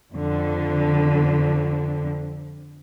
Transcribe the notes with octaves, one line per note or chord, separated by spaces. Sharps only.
F2 D3